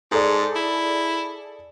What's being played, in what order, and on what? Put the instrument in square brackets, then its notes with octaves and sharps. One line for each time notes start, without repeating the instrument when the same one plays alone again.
[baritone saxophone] G#2 [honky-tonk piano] G#4 A4 D5
[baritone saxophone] E4